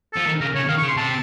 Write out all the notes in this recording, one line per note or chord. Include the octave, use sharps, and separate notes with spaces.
F3 A4
D#3
C#3 A#4
C#3 C#5
D#3 F5
C#6
C#3
C6
C3 A5